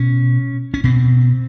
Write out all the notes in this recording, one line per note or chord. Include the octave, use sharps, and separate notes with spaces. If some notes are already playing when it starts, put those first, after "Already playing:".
Already playing: B2 C#4
C#4
B2 C4